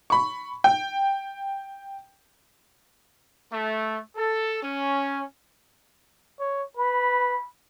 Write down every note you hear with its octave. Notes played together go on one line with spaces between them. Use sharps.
B5 C#6
G5
A3
A4
C#4
C#5
B4 B5